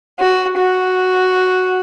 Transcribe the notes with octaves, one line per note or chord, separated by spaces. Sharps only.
F#4
F#4